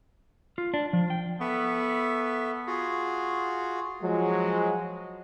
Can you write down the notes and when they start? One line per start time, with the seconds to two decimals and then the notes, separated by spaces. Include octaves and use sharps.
0.58 F4
0.74 D4
0.93 F3
1.10 G5
1.40 B3 A4 E5 C#6
2.67 F4 F#4 G#4
4.02 F3 F#3 G#3